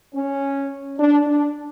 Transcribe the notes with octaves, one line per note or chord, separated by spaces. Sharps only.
C#4
D4
D4